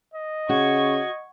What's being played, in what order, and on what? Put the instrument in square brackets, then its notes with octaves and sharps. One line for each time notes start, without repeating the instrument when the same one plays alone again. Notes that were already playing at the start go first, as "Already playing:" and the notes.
[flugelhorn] D#5
[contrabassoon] C#3 [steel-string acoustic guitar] F#4 [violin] C#6 G#6